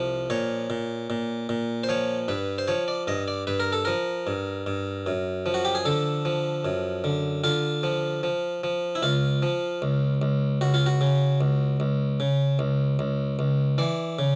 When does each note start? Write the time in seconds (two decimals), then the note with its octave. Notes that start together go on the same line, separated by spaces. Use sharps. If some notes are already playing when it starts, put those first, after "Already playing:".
Already playing: C2 F3
0.30 A#2 C#5
0.70 A#2
1.10 A#2
1.49 A#2
1.84 C5
1.89 F3 C#5
2.28 G2 B4
2.58 C5
2.68 F3 C#5
2.88 D5
3.07 G2 D#5
3.28 D5
3.47 G2 B4
3.60 A#4
3.72 A4
3.85 F3 A#4
4.27 G2
4.66 G2
5.06 F#2
5.46 F3
5.54 F#4
5.65 G4
5.75 G#4
5.85 D3 A4
6.25 F3
6.65 F#2
7.04 D3
7.44 D3 F4
7.83 F3
8.23 F3
8.64 F3
8.95 E4
9.03 C#2 F4
9.42 F3
9.82 C#2
10.22 C#2
10.61 C#2 F#4
10.74 F4
10.86 F#4
11.01 C#3
11.41 C#2
11.80 C#2
12.20 C#3
12.59 C#2
12.99 C#2
13.39 C#2
13.78 E3 D5
14.19 C#3